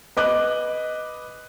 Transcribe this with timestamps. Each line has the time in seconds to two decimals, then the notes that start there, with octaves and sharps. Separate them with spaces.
0.17 B4 D#5 D6 F#6